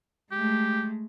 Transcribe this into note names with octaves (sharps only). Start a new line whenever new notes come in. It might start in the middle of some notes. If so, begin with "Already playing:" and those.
G#3 A3 G4